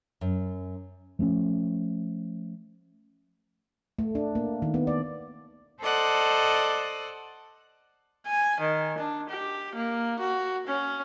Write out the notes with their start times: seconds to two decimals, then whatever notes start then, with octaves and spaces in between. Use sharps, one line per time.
0.21 F#2
1.19 F3 A3 C4 C#4
3.99 A3
4.15 D4
4.35 A#3
4.62 D#3
4.74 B3
4.87 D5
5.81 A4 C5 D5 D#5 F#5
8.27 G#5
8.60 D#3
8.98 D4
9.29 G4
9.75 A#3
10.19 F#4
10.67 C#4